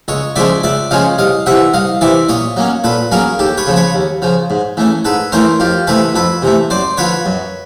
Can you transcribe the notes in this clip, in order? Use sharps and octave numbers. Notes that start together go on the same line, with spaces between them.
C#2 C#5 D#5
C#3 F3 G#3 C#4 D5 E5
C#2 D5 E5
C#3 F3 G#3 C#4 D#5 F5
C2 D#5 F5
C3 E3 E5 F#5
C2 D#5 F5
C3 E3 D5 E5
A#2 C#5 D#5
F#3 A#3 C#4
A#2 A4 B4
F#3 A#3 C#4 G#4 A#4
D#2 G4 A4
B4 C#5
C#3 F3
B4 C#5
D#2
C#3 F3
G#2
E3 A3 C#4
G#2 A4 B4
E3 A3 C#4 A#4 C5
F2 F4 G4
C3 E3 A3 A4 B4
F2 A4 B4
C3 E3 A3
F#2 C5 D5
D3 F3 B4 C#5
F#2